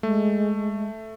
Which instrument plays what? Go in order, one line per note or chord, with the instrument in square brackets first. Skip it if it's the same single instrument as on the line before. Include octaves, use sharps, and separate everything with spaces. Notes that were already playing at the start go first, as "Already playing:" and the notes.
[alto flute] G#3 [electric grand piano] A3